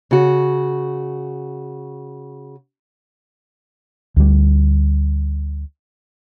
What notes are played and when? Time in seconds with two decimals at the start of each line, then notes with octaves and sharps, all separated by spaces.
0.11 C#3 F#4
4.16 D2 G3